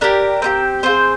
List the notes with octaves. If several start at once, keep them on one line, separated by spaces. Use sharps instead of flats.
D4 G4 A#4
C4 D#4 G4
C4 F4 G#4 C5